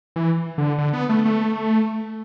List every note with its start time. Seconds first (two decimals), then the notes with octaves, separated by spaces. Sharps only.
0.16 E3
0.58 D3
0.78 D3
0.93 B3
1.09 A3
1.25 A3